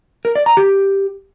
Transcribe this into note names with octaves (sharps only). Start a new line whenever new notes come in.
A#4
D5
A#5
G4